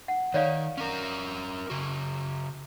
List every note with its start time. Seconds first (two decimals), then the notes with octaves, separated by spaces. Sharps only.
0.08 F#5
0.34 D#3 C#5 D5 F5
0.78 C#4 A#4
1.70 C#3 F#4